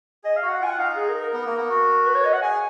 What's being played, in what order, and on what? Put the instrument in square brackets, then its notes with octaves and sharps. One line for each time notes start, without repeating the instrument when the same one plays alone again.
[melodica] G#4 [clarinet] D#5
[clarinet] F5
[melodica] F#4
[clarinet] F#5
[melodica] F4 [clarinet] G#5
[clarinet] F#5
[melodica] D#4 [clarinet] F5
[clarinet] G#4
A#4
A#4
[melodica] B3
A#3
B3
F#4
[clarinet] B4
C#5
D#5
F#5
[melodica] G#4 [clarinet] G#5